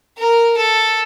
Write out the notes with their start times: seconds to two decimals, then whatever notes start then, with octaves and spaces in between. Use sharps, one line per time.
0.18 A#4
0.57 A4